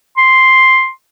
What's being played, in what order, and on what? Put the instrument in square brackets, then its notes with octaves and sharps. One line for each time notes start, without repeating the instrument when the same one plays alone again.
[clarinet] C6